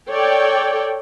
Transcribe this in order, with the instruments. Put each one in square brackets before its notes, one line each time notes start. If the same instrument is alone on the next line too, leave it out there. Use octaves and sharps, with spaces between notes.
[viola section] A4 C#5 D5 G5